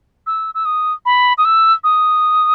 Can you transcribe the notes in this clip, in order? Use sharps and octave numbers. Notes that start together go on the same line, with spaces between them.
E6
E6
D#6
B5
D#6
E6
D#6